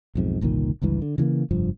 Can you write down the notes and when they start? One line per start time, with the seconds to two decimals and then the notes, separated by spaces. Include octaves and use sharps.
0.15 B1 F2 G#2
0.41 G1 C2 A#2 D#3
0.82 G1 C#2 G2 E3
1.02 D3
1.18 C#3 E3 G#3 A#3
1.51 F1 G2 F3